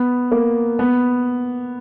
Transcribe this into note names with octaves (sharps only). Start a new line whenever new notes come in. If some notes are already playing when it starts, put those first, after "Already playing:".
Already playing: B3
A#3
B3